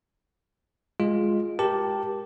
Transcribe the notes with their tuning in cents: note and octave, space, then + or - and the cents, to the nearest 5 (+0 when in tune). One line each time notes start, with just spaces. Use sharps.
G#3 +0 F4 +0
G4 +0 A#4 +20 A5 +0